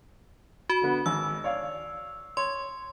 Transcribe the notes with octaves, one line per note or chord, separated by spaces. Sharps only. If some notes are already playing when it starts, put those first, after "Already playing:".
F#4 B5
D3 B3
G#1 E6
C#5 D5 F5
C#5 C6